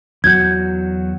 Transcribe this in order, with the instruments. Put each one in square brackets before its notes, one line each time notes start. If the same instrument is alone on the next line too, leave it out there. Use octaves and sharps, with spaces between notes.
[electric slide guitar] E2 F#3 F#4 [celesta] G6 G#6